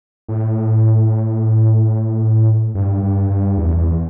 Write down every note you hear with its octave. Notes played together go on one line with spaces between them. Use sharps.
A2
G2
G2
G2
E2
E2